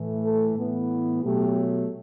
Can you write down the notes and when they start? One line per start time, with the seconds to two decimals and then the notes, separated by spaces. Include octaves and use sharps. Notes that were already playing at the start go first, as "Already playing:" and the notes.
Already playing: A2 E3 A3
0.22 A4
0.56 A2 E3 B3
1.24 B2 F#3 A3 G4